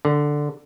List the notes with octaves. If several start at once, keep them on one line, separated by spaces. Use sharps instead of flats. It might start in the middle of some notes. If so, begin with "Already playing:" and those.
D3